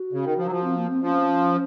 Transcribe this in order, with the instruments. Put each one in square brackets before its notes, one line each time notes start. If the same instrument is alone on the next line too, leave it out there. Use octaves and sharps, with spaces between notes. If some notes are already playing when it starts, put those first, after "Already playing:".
Already playing: [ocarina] F#4
[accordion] C#3
D#3
F3
F#3
F3
[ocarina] C4
A#3
C4
[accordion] F3 [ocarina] C#4